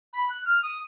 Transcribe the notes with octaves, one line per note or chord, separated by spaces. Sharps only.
B5
F#6
F6
D#6